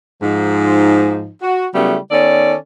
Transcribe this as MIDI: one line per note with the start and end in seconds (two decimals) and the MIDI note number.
0.22 1.29 44
0.22 1.29 53
0.22 1.29 63
1.42 1.66 66
1.74 1.97 49
1.74 1.97 54
1.74 1.97 55
1.74 1.97 57
1.74 1.97 59
1.74 1.97 64
2.11 2.55 51
2.11 2.55 59
2.11 2.55 61
2.11 2.55 69
2.11 2.55 74